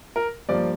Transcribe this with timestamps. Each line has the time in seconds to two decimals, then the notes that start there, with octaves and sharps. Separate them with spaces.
0.16 A#4
0.49 G2 F3 A#3 D5